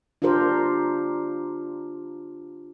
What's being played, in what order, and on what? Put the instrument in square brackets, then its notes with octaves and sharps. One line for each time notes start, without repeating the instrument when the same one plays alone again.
[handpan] D4 F4 G4 A#4 C5